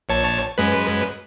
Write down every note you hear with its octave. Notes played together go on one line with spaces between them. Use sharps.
A#1 C#5 A5
F#2 G#3 B4